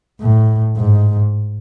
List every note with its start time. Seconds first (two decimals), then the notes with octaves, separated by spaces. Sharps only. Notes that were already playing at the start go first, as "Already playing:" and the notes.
0.21 A2
0.77 G#2